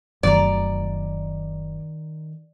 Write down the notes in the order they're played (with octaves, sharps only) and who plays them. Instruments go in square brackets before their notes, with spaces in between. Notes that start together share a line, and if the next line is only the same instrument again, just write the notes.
[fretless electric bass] F1 F#2 [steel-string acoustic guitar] D#3 A#5 [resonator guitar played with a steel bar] D5